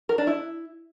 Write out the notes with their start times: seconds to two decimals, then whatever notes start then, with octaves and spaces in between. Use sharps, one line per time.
0.09 A#4
0.18 D4
0.27 E4